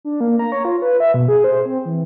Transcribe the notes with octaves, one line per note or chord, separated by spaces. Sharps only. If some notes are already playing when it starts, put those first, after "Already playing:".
D4
A#3
A#5
C#5
F4
B4
E5
B2
G#4
C5
C4
E3